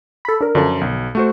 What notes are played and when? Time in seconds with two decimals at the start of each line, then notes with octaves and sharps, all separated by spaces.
0.25 A4 B5
0.41 D4 A#4
0.55 F#2 D3 F3 A5
0.81 B1
1.15 A3 F#4 C5